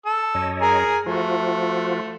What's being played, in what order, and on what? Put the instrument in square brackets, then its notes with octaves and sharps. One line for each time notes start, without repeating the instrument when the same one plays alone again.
[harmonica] A4 E6
[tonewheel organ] F#2 C#5 D#5
[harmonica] G#4 A#4 G#5
[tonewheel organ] F3 F4 F#4 [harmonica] A3